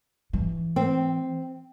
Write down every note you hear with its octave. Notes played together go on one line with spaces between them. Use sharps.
E3
C4